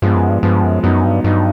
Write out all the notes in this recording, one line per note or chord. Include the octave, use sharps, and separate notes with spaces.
G2 F3 G#3 B3
F#2
G2
G2 F3 G#3 B3
F#2
F#2 F#3 B3 D#4
G2
G2 F#3 B3 D#4